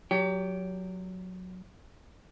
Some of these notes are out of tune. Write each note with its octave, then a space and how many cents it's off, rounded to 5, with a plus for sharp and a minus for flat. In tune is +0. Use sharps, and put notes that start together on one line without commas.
F#3 -10 G4 +0 C#5 +35